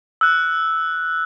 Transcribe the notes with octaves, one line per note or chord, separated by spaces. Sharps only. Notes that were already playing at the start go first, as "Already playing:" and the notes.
E6 F#6